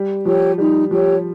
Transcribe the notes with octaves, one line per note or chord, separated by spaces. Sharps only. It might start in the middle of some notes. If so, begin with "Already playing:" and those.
Already playing: G3
F3 G4 C#5
G3 D#4
F3 G4 C#5